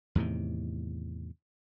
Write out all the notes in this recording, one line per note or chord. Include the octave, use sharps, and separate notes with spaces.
E2 A2 C3 D#3